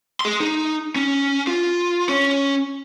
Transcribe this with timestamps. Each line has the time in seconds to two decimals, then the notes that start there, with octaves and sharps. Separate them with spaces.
0.21 G#4 C6
0.40 D#4
0.96 C#4
1.47 F4
2.09 C#4 C#5